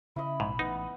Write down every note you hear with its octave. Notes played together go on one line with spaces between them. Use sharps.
C#3 C#4 E4 D#5 B5
A#1 G#2 C3 F3
A1 B3 D#4